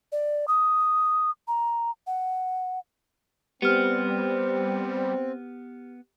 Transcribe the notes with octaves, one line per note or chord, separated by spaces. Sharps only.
D5
D#6
A#5
F#5
G3 B3 C4 G4 F6